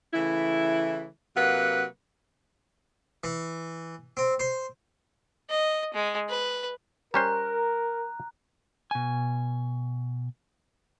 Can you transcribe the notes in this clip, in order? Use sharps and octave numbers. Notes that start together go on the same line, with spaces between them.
C#3 E3 A3 E4
C3 F#3 A#3 B4 F5 F#5
E3
C4
C5
D#5
G#3
B4
G3 C#4 A#4 C5 A#5 F#6
B2 G#5